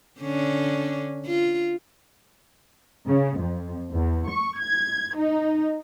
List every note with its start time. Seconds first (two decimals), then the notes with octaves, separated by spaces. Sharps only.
0.20 D3 C#4 D4
1.26 F4
3.07 C#3
3.40 F2
3.92 E2
4.29 C#6
4.59 G#6
5.16 D#4